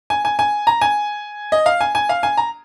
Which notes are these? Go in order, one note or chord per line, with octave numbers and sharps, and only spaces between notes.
G#5
G#5
G#5
A#5
G#5
D#5
F5
G#5
G#5
F5
G#5
A#5